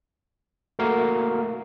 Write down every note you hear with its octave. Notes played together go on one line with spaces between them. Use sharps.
A3 A#3 F#4 A#4 F5